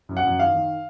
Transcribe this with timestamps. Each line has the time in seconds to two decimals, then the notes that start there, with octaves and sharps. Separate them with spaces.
0.09 F#2
0.17 F#5
0.24 F#2
0.39 D#3 F5
0.54 D#3